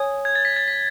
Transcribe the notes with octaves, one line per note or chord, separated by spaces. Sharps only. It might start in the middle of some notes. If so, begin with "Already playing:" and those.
Already playing: C#5 G#5 D#6
G#6
A6
B6
A6
B6